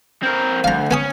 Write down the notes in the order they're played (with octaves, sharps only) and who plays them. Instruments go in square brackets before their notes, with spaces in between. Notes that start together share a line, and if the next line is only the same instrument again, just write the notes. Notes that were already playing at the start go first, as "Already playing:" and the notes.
[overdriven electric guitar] C4 A#4
[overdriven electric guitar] D2 [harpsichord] F5 A#5
[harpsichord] B3 G#5 D#6 [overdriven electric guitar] C#4